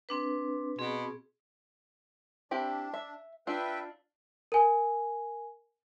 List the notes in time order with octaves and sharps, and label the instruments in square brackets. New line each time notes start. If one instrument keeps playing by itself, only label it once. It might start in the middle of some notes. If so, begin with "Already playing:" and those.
[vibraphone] C4 D4 B4
[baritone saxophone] B2 [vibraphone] C4 G#4
[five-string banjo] C4 E4 G4 [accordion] D4
[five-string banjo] E5
[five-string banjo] D4 F4 [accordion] B4 E5 G5
[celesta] A#4 G#5